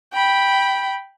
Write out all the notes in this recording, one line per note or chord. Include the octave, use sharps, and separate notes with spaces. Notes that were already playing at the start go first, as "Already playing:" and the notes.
G5 B5